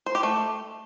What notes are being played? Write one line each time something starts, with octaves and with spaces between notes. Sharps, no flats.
C5
G4
A3